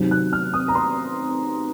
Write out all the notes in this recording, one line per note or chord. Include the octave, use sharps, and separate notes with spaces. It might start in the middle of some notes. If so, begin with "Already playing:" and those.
Already playing: C3 D#3 F#3
F#6
F6
D#6
A#5
C6